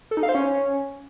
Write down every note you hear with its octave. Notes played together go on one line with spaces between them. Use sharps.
A4
D#4
F5
C5
C#4